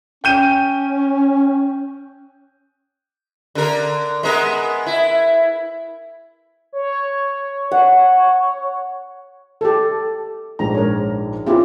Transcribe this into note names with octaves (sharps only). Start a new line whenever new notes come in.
C#4 G5 G6 D#7
D3 A#4
G#3 B3 A#4
E4
C#5
F#5
G4 A4
A#1 G#2 G#3 A#5
A#4 C#5
B3 C#4 E4 F4 G4 G#4